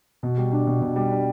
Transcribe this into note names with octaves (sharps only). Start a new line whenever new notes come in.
B2
G3
D4
B2
B2
G3
D4